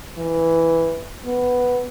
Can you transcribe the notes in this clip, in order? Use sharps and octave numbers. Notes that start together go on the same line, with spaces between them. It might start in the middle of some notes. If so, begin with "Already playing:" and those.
E3
B3